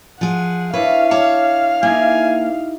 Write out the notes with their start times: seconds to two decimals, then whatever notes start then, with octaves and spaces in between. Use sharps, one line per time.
0.21 F3 G#4 F#5
0.73 D4 E4 B4 C#5 F5
1.11 C#5 A5 D6
1.83 A#3 D#4 E4 G4 G#5